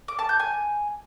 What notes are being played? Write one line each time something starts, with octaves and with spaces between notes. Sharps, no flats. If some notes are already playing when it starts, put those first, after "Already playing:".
D6
A5
G6
G#5